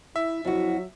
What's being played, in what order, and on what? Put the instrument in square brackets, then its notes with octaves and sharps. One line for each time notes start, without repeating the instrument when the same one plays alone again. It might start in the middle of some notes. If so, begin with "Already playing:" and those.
[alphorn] E4 [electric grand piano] E5
[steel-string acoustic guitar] F2 F#4 [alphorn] F#3 [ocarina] E4